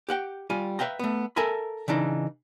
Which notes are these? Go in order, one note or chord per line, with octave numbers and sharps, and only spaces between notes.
G4 F#5 G5
G3 F4 G#5
B4 E5 F5 G5 A#5
A3 B3
A4 A#4 E5 G#5 B5
C#3 E3 D4 D#4